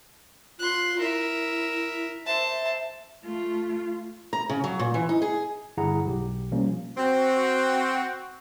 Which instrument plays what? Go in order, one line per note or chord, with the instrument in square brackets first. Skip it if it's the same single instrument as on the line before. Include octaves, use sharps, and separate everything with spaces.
[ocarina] F4 [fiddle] C6 F#6
[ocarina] E4 [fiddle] A#4 E5
[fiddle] C5 A5 [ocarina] E5
[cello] A3 F4
[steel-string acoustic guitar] A#5
C#3
F#3
A#2
E3
D#4
G#4
[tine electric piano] G2 D3 E4 G#4 F#5 A#5
B1 G4
B2 F3 G3 A#3 C#4
[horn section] C4 F#4